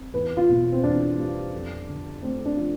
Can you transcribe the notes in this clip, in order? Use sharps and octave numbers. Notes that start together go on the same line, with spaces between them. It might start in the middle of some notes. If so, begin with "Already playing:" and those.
Already playing: C4
E2 B4
F4
B2
C4
E2 D4
G3
F2
D3
A3 C4
D4
F3